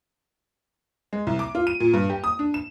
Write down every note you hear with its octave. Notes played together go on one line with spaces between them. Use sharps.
G#3
C2
D6
F4
D#7
A#2
G2
G4
D#6
D4
E7